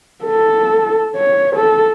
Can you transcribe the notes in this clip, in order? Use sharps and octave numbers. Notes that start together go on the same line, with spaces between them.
A4
C#5
A4